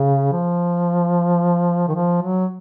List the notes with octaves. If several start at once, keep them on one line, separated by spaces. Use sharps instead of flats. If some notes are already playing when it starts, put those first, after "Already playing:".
Already playing: C#3
F3
D#3
F3
F#3